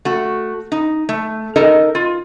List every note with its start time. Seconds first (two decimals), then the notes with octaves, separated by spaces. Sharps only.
0.05 A3 F#4
0.72 D#4
1.09 A3
1.56 D#4 A4 A#4 D#5
1.95 F4